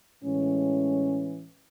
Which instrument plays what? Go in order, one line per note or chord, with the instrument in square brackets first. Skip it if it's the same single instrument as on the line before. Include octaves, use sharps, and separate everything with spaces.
[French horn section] A2 E3 G#3 C#4